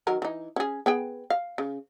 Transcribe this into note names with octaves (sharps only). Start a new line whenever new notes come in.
D#3 F#3 A#4
E3 D#4
C#4 G#4
B3 G#4 G5
F5
C#3